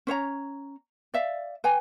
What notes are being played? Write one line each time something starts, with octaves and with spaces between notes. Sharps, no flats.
C#4 C5 C#5 A#5
D5 E5 F5
B4 G5 G#5